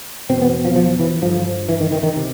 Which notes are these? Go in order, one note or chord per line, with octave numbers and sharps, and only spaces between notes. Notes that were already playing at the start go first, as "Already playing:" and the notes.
E2 B2 C4
B3
F3
F3
E3
G2 D3 F3
E3
D#3
D#3
D#3
C3